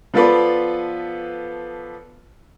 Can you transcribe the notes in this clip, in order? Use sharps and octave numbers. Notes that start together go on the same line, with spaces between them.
F3 B3 F4 A4 B4 D5